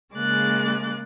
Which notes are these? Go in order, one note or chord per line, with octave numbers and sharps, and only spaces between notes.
C#3 G#3 A#3 D6 F#6 A6